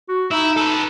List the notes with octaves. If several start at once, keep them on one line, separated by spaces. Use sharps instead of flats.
F#4
D#4 E4
A4 B4